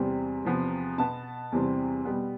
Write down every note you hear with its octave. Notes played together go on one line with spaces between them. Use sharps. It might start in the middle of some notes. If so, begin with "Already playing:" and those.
Already playing: E2 C3 G3 C4
E2 C3 F3 B3
B2 B3 A5
E2 C3 E3 G3 C4
B2 G3 B3